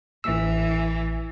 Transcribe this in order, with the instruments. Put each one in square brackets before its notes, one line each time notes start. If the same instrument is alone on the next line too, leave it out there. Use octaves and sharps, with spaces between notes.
[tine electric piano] A1 E6 [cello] E3